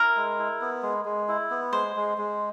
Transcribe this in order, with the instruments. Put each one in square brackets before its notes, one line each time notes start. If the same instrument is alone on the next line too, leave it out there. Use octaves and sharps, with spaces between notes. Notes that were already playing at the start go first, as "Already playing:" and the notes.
Already playing: [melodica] E4 [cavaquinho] A#4
[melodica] G#3
E4
B3
G#3
G#3
E4
B3
[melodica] G#3 [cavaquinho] C5
[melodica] G#3
G#3